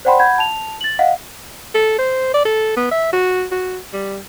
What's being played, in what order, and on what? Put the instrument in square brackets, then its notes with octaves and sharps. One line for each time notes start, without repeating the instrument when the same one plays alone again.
[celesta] C5 D5 F#5 G5 B5 C6
F#5 B5 G6 G#6
A5 F7
A6 F#7
D#5 F5 F#5
[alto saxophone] A4
C5
D5
A4
B3
E5
F#4
F#4
G3